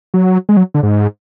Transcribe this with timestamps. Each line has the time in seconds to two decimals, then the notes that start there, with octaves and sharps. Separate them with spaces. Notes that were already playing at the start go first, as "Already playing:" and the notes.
0.14 F#3
0.49 G#3
0.57 F#3
0.74 D3
0.83 G#2